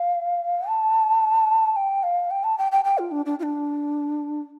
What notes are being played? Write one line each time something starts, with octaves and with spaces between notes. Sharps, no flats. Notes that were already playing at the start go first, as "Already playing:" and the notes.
Already playing: F5
A5
G5
F5
G5
A5
G5
G5
G5
F4
D4
D4
F4
D4